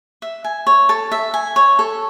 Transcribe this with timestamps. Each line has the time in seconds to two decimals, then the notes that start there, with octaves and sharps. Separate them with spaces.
0.22 E5
0.44 G#5
0.67 C#5
0.89 A4
1.12 E5
1.34 G#5
1.56 C#5
1.79 A4